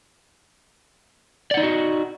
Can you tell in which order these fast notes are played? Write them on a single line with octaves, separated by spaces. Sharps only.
D5 F#5 D#4 D#5 F#4